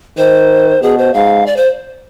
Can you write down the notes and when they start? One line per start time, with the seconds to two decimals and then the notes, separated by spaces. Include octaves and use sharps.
0.18 D#3 C5
0.82 B2 G#4
0.98 C5
1.14 G#2 F5
1.47 D5
1.57 C5